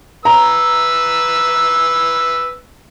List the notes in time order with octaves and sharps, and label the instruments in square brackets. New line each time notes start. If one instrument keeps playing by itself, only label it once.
[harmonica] B4 E6 [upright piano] A#5